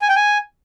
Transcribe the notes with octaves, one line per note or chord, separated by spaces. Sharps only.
G#5
G5
G#5